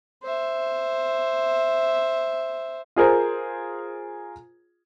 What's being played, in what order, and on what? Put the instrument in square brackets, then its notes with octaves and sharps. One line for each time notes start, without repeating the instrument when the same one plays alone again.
[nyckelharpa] C5 E5
[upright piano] F4 G#4 A#4 C5